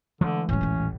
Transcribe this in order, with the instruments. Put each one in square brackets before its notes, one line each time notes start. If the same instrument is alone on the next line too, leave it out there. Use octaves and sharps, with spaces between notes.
[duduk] D3 [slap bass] E3 G#3 A3
[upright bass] A2 F#3 [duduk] C#4
[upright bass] D#1 A1